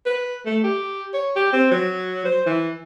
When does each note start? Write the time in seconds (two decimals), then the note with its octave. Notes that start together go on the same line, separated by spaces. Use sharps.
0.06 B4
0.46 A3
0.64 G4
1.14 C#5
1.36 G4
1.53 C4
1.71 F#3
2.25 C5
2.46 E3